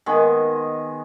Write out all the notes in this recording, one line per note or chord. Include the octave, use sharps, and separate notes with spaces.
D#3 G#3 B3